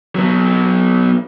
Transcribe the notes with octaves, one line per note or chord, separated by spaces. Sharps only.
F#3 B3